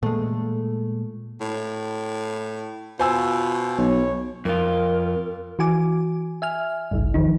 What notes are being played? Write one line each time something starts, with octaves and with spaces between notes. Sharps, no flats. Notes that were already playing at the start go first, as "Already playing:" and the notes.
A#2 G#3 A3
A2
B2 F4 C5 G#5 E6
B1 C#5
F2 F4 A#4
E3 F#4 G#5 D6
E5 G#5 F6
G#1 C#2 G2
E2 D#3 F3 D#4